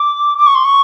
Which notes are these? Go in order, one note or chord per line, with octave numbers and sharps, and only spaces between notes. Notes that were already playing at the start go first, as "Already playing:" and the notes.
Already playing: D6
D6
C#6
C6
C#6